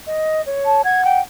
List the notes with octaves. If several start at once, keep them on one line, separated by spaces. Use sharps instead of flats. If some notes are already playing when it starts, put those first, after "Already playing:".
D#5
C#5
A5
F#5 G#6
G5